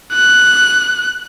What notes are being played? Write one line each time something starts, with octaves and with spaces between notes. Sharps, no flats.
F#6